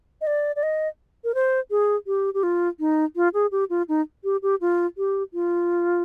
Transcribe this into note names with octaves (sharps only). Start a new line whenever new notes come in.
D#5
D5
D5
D#5
A#4
C5
G#4
G4
G4
F4
D#4
F4
G#4
G4
F4
D#4
G4
G4
F4
G4
F4